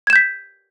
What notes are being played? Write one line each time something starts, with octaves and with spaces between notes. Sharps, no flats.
G6 G#6 B6 E7